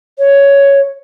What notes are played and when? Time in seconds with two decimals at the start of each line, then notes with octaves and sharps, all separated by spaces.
0.18 C#5